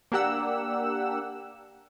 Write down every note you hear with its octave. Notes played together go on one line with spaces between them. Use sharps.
A#3 D4 G4 F#5 E6